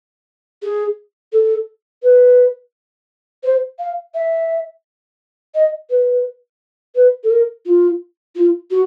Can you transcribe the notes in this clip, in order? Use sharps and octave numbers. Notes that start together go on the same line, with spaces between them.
G#4
A4
B4
C5
F5
E5
D#5
B4
B4
A4
A#4
F4
F4
F#4